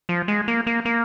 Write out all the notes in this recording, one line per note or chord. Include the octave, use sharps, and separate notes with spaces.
F3
G#3
A#3
A#3
A#3